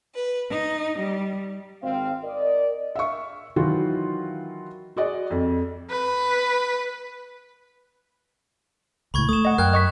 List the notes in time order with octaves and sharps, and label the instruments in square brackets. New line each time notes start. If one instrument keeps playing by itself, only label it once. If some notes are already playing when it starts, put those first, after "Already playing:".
[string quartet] B4
D#4
G3
[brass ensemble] G#1 C4 F5
A#4 D5 D#5
[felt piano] E5 F5 C#6
D#3 E3 F#3 F4 F#4
F#4 G#4 D5 D#5
F2
[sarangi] B4
[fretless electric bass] C#2 A2 [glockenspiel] B5 C#6 G#6
[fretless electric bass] A3 [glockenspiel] D#6 E7
[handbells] D#5 F#5
[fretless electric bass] F#2 [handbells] A#4 G5 [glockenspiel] F#6 G#6
[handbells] D#5 C#6 B6